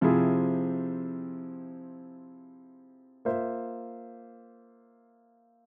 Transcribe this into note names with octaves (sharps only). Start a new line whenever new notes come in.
C3 F3 C4 E4 G#4
A#3 F4 C5 E5